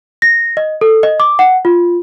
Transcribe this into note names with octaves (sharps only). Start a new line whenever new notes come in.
A#6
D#5
A4
D#5
D6
F#5
F4